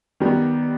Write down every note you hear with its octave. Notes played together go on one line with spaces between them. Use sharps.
D#3 G3 B3